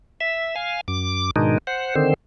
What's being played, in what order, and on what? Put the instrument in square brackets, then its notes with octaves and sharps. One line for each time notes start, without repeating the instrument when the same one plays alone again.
[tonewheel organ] E5
F5 G#5
F#2 D6
G#2 B2 D#3 G#3 D4 D#4
C5 F#5
D3 D#3 C4 C5